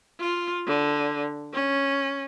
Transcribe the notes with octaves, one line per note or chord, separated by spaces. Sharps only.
F4
D3
C#4